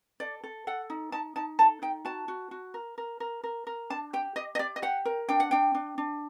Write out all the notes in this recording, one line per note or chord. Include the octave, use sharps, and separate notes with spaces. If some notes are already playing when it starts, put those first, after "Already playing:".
A4 D5
A4
A4 F#5
D#4
D#4 A5
D#4 A5
A4 A5
D#4 G5
F#4 A5
F#4
F#4
A#4
A#4
A#4
A#4
A#4
D4 A5
G4 G5
G4 D#5
D#5
G4 D5
D#5
G4 F#5
A#4
D4 G5
F#5
D4 G5
D4
D4